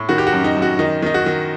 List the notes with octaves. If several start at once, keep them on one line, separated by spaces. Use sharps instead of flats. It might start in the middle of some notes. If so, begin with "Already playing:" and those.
Already playing: A2
D#3 F#4
G4
F#4
F#2
D#4
F#2
F#4
D#3 D#4
D#3 D#4
F#4
D#3